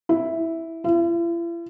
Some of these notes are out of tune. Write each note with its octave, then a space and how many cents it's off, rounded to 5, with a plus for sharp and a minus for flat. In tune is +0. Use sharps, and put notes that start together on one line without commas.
E4 -5
E4 +45